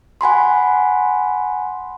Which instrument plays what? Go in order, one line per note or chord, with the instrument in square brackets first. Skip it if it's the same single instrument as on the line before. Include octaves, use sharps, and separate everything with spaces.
[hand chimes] F#5 G#5 B5 C6